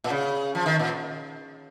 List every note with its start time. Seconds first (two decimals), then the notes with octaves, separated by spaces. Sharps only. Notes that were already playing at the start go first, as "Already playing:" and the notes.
0.04 A#2
0.10 C#3
0.55 F3
0.66 D#3
0.79 A#2